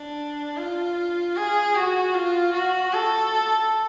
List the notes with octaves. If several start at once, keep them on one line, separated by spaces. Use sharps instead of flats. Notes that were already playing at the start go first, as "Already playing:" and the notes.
Already playing: D4
F4
G#4
F#4
F4
F#4
A4